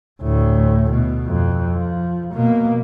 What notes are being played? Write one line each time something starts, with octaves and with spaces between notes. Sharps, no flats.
D2 A2
B2
F2
F3
B2 A#3